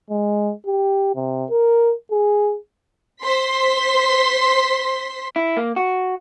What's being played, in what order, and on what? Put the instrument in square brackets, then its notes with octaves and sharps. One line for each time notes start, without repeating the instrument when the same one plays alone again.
[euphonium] G#3
G4
C3
A#4
G#4
[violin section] C5 C6 B6
[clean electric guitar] E4
A#3
F#4